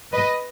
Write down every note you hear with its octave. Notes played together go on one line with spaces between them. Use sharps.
B4 D#5